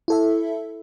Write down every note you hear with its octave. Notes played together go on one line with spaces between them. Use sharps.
E4 A4 E5